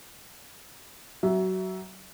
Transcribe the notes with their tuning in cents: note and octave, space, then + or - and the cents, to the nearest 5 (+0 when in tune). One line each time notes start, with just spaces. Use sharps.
F#3 +20 E5 +0